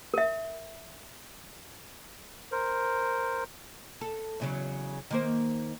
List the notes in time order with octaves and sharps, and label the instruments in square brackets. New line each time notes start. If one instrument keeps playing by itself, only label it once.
[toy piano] A#4 E5
[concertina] A#4 C5
[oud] A4
E2 C#3 F#3
D#3 A#3 C5